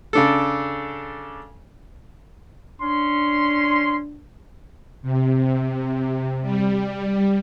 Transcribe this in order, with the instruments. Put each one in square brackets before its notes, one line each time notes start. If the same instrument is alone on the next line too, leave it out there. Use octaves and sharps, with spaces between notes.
[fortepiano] C#3 D4 A4
[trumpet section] C#4 C6 [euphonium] D4
[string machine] C3
G3